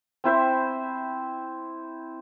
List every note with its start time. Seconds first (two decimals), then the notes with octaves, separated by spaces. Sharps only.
0.24 C4 E4 C5 E5